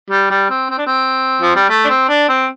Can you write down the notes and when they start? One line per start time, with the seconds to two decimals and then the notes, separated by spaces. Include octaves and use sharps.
0.10 G3
0.30 G3
0.50 C4
0.70 C4
0.78 D4
0.87 C4
1.42 F3
1.56 G3
1.69 A3
1.85 D4
1.89 C4
2.09 D4
2.29 C4